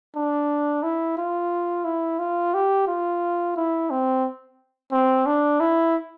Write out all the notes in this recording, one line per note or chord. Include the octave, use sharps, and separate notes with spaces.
D4
E4
F4
E4
F4
G4
F4
E4
C4
C4
D4
E4